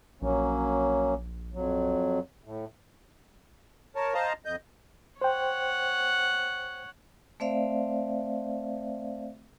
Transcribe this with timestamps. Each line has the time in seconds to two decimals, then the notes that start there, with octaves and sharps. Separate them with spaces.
0.22 A#1 F#3 A#3 C#4
1.54 F2 F#3
2.44 A2
3.96 A#4 C#5 A5
4.14 C5 D#5 F5 A5 A#5
4.45 F2 D#5 G6
5.21 C5 C#5 F#5 G5
7.40 A3 C4 C5 D5 E5 F5